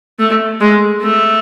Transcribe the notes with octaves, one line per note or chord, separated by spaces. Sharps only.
A3
G#3
A3